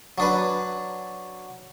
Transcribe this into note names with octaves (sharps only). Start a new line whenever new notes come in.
F#3 D4 B4